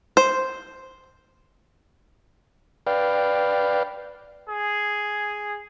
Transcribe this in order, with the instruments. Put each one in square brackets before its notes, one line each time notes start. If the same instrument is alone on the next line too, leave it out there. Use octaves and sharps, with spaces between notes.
[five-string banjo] C5
[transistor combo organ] B4 D5 F5 G5
[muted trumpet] G#4